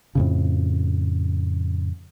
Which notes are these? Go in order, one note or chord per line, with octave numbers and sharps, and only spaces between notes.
F2 A2 C#3